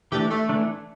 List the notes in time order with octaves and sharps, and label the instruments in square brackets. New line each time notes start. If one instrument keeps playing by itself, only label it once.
[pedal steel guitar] E3 A3 D4 [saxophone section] G4
[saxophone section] A3
[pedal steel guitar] E3 A3 D4